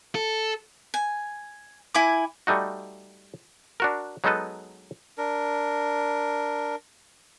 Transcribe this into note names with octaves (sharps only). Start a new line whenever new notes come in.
A4
G#5
E4 G#5 D6
G3 A3 D#4 F#4
D4 F#4 A#4
F#3 G#3 B3 D#4 A4 B4
D4 A#4